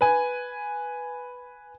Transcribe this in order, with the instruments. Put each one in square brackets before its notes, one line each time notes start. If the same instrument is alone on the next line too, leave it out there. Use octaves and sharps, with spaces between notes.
[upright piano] B4 G#5